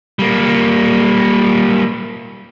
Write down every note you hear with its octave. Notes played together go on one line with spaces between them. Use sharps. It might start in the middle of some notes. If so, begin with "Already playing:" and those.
G3 A#3